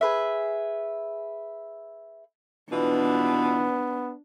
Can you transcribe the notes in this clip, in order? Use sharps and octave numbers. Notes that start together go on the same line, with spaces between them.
G#4 B4 E5
B2 E3 B3 D4 F4